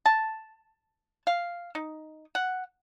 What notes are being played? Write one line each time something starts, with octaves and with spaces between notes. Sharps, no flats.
A5
F5
D#4
F#5